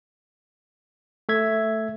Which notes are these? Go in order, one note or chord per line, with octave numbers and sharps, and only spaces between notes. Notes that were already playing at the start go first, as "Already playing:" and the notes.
A3 E5 G#6